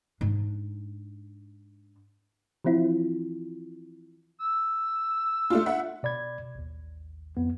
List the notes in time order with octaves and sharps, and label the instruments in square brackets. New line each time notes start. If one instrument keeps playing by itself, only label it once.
[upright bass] G#2 D4
[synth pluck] E3 F3 C4 E4 F4
[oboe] E6
[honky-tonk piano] A3 D4 F4
E5 F#5
[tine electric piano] B2 D5 B5 G#6
A1 D#2
F2 B3